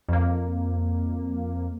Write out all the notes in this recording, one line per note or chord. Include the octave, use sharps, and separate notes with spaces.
F2 A#3